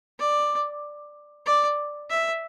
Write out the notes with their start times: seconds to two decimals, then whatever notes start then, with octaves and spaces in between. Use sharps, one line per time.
0.19 D5
1.46 D5
2.10 E5